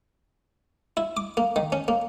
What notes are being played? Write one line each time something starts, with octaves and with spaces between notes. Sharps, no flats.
E4
D6
A#3
D#3
C#4
A#3